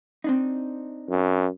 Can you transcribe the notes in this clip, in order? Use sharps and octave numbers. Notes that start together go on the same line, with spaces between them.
C4 D4 D#4
F#2